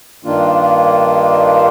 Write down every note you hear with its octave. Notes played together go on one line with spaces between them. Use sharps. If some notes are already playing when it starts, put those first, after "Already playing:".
G2 D#3 A#3 D4 F4